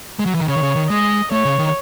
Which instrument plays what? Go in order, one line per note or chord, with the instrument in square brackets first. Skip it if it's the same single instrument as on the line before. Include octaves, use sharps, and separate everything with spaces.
[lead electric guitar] G#3
F#3
E3
D#3
[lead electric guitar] C#3 [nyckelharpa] C#5
[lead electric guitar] D#3
C#3
D#3
[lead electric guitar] G#3 [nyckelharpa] D#5
[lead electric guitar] A3 [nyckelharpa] C#5
[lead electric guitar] C#3
D#3